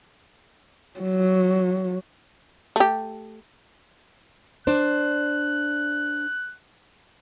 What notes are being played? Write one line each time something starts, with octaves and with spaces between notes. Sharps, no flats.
F#3
A3 G4
D4 C5 F#6